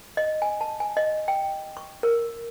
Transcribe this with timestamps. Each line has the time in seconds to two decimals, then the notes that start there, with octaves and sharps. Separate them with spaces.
0.17 D#5
0.42 G#5
0.61 A5
0.80 G#5
0.97 D#5
1.28 G5
1.77 C#6
2.03 A#4